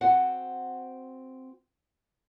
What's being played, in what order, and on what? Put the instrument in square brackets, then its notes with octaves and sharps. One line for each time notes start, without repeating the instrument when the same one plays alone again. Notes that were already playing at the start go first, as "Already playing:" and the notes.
[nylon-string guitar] C4 F#4 F#5